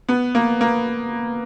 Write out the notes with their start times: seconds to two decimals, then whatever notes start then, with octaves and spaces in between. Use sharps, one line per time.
0.09 B3
0.35 A#3
0.61 A#3